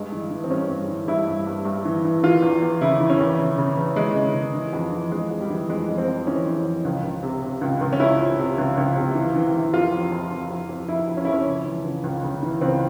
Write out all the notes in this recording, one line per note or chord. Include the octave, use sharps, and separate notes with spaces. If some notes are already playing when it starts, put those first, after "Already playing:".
Already playing: G2 G#3
E3
E3
C4
G2 C#4
G2
E3
G2 E4
G2
G2
G2
E3
E3
E3 F4
E2
E2
C#3 E4
E3
C#4
E2
C#3
C#3
E2
E3 G#3
C#3
C#3
E3
F2
E3
F2 G#3
F2
G3
E3
F2 G#3
F2
C4
F2
E3 C#4
E3
F2
C#2
C#2
C3
C3
C#2
C#2
C#4
C#2 E4
F3
C3
C#2
C#2
C3
E3
E3
E3
F2 F4
F2
F2
F2
F2
F2
F2 E4
F2
C#4
F2 E4
C#4
C#2
E3
C#2
C#2
C#3
E3
C#2 C4